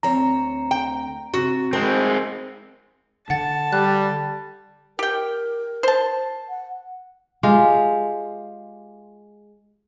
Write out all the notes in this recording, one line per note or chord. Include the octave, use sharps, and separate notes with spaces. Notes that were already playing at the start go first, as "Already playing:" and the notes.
D2 C4 C#5 A#5
G5
C3 F#4
G#3 C4 A#4 C5 A5
D3 F#5 A5 A6
G3 F#6
G4 A#4 G5
C5 A5
F#5
G#3 F4 G4